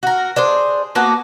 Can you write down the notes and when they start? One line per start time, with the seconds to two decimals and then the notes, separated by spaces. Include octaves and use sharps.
0.03 F#4 A#4
0.36 D4 G#4 C5
0.95 A#3 B3 F#4 A5